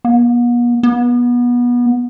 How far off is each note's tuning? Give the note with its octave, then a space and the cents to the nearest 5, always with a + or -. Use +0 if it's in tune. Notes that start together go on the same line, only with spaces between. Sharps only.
B3 -45
B3 -25